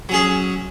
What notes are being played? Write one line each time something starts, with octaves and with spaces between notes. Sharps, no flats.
F#3 C#4 G#4